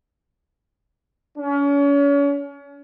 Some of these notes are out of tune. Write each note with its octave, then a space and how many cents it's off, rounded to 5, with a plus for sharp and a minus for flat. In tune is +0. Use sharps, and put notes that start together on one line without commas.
C#4 +35